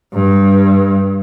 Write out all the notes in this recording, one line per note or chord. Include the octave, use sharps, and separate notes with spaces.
G2